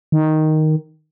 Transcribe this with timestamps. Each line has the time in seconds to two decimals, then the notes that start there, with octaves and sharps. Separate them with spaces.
0.12 D#3